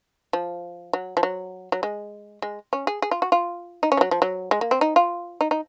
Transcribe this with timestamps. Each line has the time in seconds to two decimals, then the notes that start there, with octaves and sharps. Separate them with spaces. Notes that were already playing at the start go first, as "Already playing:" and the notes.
0.33 F3
0.93 F#3
1.17 F3
1.23 F#3
1.72 F#3
1.83 G#3
2.42 G#3
2.73 C#4
2.87 G#4
3.02 G#4
3.11 F4
3.22 F#4
3.32 F4
3.83 D#4
3.92 C#4
3.97 F3
4.01 F#3
4.11 F3
4.22 F#3
4.51 G#3
4.61 A#3
4.71 C4
4.81 D#4
4.96 F4
5.41 D#4
5.51 D#4